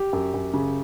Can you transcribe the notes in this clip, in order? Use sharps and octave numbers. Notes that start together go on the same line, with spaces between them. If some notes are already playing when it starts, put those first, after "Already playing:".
Already playing: G4
F#2
F#2
C#3